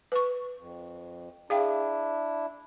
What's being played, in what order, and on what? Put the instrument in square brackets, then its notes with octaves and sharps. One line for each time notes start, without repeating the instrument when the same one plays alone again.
[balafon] B4 C#6
[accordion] F2
[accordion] D4 E4 [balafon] G#4 F5 G5